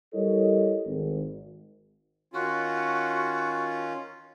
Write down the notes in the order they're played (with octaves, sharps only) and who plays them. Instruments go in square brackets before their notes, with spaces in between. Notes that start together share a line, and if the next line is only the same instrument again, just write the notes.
[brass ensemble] G3 E4 A4 A#4 C#5 D#5
G#1
[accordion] D#3 C#4 F4 [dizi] F#4